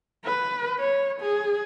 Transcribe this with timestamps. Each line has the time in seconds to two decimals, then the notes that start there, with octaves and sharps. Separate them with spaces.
0.25 B4
0.80 C#5
1.21 G#4